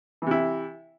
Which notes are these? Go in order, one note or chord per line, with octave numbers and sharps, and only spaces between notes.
C3 E3 E4